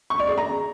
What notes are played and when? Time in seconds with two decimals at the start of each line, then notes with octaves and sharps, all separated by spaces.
0.10 C#6
0.19 D5
0.28 G#4
0.38 A#5